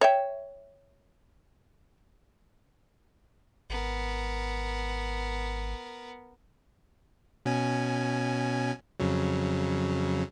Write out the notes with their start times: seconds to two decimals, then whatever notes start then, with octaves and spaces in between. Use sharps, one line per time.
0.01 C#5 E5 G5
3.70 G#1 B3 A#4
7.46 B2 C#4 G#5
9.00 F2 C#3 F#3